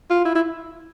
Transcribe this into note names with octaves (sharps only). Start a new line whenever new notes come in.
F4
E4
E4